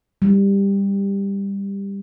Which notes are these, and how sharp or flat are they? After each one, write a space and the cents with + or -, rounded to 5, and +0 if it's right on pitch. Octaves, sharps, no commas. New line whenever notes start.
G3 +15